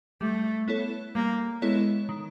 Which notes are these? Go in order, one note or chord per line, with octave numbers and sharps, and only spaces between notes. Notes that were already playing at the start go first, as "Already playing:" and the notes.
G3 A3
B3 E4 A4 C#5
G3 A#3
G#3 B3 E4 A4 C#5
D#3